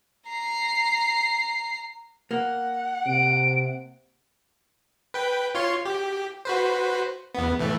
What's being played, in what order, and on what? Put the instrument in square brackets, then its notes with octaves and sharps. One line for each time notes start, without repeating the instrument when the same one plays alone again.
[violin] A#5 C7
[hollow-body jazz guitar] A#3 [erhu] F#5
[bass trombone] C3 [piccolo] D7
[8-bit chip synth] B4 G5
F4 C#5 C6
G4
F#4 B4 C5
E2 B3
A2 E3 A3